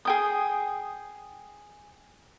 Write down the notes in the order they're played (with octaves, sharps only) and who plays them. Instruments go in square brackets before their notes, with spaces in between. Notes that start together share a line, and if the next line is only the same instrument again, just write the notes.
[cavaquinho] G#4 G5 D#6